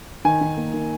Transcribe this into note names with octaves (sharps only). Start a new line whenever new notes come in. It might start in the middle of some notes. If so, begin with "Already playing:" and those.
D#3 G#5
D#3
A#3
D#3